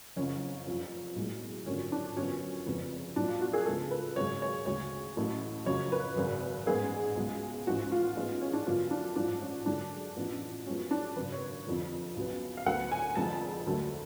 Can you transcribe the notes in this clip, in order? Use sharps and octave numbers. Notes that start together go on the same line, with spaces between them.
F#1 F2 C#3 C#4
F1 F2 F3
B1 A2 G#3
G#1 F#2 D3 F3 C#4
D4
F#2 D3 F3 B3 C#4
F1 F2 C#3 G#3 B3
B1 A2 F3 D4
F4
F#4
G#4
C#2 C#3 F3 G#3 B3 A4
B4
G#1 F#2 C#3 G#3 C#5
C#5
D2 C#3 G#3 C#5
A1 A2 F#3 A3
F#1 F2 C#3 F#3 C#5
B4
G#1 F#2 C#3
A1 G#2 G#3 B3 G#4
C#2 B2 G#3
A1 G#2 F3 F#4
F4
A1 G#2 G#3 B3
C#4
D4
F#2 D3 F3 B3 F4
D4
A1 G#2 F3 D4
C#4
F#2 D3 G#3 D4
A1 A2 F3 B3
F#2 F3 G#3 B3 C#4
D4
G#1 F#2 C#3 B4
C#5
F1 F2 D3 F3
C#2 B2 F#3 B3
F5
D2 D3 F#3 B3 F#5
G#5
F1 F2 D3 G#3 A5
D2 D3 F#3 A3